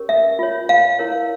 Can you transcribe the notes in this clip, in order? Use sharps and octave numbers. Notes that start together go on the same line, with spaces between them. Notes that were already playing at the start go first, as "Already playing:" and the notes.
Already playing: C#4 G4 A#4 C#5
E5
F4 C#5
F5
E4 A#4 C#5